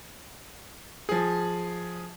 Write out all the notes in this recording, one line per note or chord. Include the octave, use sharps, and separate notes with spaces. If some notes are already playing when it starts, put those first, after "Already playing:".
F3 G#4